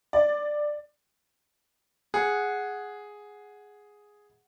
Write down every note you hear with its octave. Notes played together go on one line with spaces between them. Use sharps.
D5
G#4 F#5